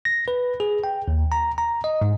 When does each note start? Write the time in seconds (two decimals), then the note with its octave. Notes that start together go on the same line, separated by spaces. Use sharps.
0.05 A#6
0.28 B4
0.60 G#4
0.84 G5
1.08 D#2
1.32 A#5
1.58 A#5
1.84 D#5
2.01 G#2